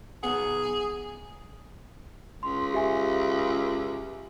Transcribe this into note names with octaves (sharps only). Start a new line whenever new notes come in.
B1 B3 G#4 F#5
C#2 C6
G4 E5 G#5